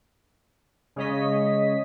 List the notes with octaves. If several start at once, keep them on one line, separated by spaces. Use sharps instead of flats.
C#3 G#3 C#5 D#5 B6